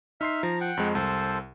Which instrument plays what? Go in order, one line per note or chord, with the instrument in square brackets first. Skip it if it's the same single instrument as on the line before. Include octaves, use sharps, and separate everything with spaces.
[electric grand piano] D#4 C6 C7 [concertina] E5 F6
[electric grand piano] F3 [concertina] A#5
[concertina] F#5 G5
[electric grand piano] F2 G#3
[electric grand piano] C2 [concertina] A4 C5